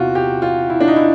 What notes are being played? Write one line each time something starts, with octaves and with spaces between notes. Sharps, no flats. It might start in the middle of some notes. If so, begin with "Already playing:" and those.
Already playing: E2 C3 E3 F4 F#4
G4
F4
E4
D4
D#4
E4